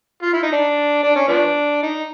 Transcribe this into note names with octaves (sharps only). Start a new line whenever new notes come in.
F4
E4
D#4
D4
D4
C#4
F3 B3 D4
D#4